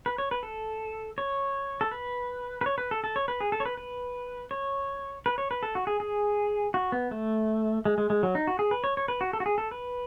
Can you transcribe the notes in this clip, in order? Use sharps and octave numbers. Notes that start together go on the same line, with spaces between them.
B4
C#5
B4
A4
C#5
A4
B4
B4
C#5
B4
A4
A4
C#5
B4
G#4
A4
C#5
B4
B4
C#5
B4
C#5
B4
A4
F#4
G#4
G#4
F#4
B3
A3
G#3
G#3
G#3
F#3
D#4
F#4
G#4
B4
C#5
C#5
B4
F#4
A4
F#4
G#4
A4
B4